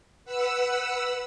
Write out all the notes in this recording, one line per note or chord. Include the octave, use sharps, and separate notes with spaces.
B4 F#5 E6